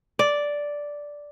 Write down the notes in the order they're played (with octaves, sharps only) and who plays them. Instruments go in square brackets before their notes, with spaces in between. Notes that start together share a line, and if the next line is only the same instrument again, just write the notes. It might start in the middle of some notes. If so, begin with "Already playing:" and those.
[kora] D5